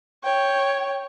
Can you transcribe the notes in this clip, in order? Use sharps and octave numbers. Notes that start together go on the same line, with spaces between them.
C#5 G5